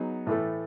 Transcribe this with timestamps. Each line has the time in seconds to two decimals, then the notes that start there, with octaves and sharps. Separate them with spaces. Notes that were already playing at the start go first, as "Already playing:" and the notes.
Already playing: F#3 B3 D#4 G#4
0.27 A2 E3 A3